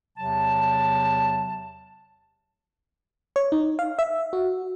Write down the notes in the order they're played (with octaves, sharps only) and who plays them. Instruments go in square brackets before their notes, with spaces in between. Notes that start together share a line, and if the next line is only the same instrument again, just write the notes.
[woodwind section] E2 C3 F#3 A5
[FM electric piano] C#5
D#4
F5
E5
F#4